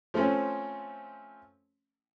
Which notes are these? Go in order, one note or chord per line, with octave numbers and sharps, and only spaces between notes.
F3 A3 C4 C#4